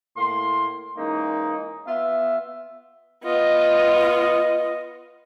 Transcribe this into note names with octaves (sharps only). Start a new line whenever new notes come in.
A2 A#3 C6
E3 G#3 A#3 C#4 D#4
B3 F4 E5
B3 F4 D#5